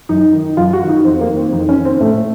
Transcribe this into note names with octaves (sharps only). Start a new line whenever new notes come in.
F#2 D#4
D#3
F#2 F4
F#4
D#3
D#4
F2 C4
A#3
D#3
C4
F2 D#4
C#4
D#3
C4
A2 A3